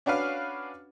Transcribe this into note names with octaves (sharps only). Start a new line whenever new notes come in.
C#4 D4 F#4 B4 F5